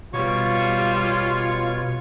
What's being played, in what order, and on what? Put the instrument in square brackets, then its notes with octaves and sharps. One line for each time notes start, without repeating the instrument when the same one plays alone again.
[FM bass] B2 [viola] G3 [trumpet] F4 [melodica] C#5 C#6